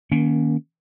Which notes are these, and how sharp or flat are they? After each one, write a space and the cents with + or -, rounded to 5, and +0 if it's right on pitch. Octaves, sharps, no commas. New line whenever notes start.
D#3 +0 A#3 +25 C#4 +20